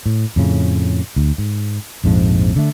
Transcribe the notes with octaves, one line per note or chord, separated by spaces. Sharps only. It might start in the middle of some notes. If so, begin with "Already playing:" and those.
A2
F2 A2 C#3
D2
G#2
A#1 F2 G#2 F3
D3 A3